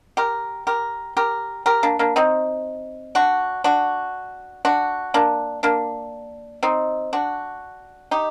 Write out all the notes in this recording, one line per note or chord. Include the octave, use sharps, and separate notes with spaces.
G4 A#4
G4 A#4
G4 A#4
G4 A#4
A#3 D4
A#3 D4
C4 D#4
D4 F#4
D4 F#4
D4 F#4
A#3 D4
A#3 D4
C4 D#4
D4 F#4
D#4 G4